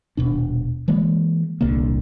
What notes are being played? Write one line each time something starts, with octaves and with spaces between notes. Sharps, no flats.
D#1 B2 D4
E3 G#3 A#3
D#1 C2 D3 A#3